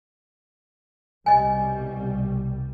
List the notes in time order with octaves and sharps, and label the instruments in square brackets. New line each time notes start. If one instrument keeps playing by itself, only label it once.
[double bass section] C2 B2 G3 [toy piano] D#5 G#5